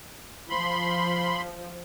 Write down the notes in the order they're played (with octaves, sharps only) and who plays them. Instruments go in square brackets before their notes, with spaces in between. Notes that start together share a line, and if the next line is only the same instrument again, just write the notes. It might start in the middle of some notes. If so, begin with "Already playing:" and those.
[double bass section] F3 [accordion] B5 C6